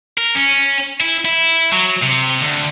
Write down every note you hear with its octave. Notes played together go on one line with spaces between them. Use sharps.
A#4
C#4
E4
E4
F#3
C3
D2